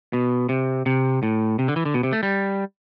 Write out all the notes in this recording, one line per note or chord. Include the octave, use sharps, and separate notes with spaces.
B2
C3
C3
A2
C3
D3
E3
D3
B2
C3
A3
G3